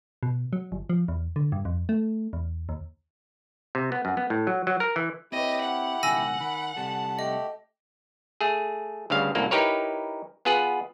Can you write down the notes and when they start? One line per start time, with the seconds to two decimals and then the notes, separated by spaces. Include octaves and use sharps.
0.23 B2
0.53 F#3
0.72 G1
0.90 F3
1.08 E2
1.36 D3
1.52 G2
1.65 F2
1.89 A3
2.33 E2
2.69 D#2
3.75 C3
3.92 B3
4.05 F#2
4.17 B3
4.30 A2
4.47 F#3
4.67 F#3
4.80 A#4
4.96 E3
5.32 C4 E4 G4 B4 C#5 D#5
5.62 F#5
6.03 C#2 B2 D#3 G#5 E6 A#6
6.40 D#3 B5
6.76 C3 G3 A4 A5
7.19 A3 G4 D#5
8.41 A3 G#4
9.10 D2 G2 C#3 F5
9.35 C2 F#2 A2 A#3
9.51 D#4 E4 G4 A#4 B4 C#5
10.45 B3 F4 G#4 B4 F#5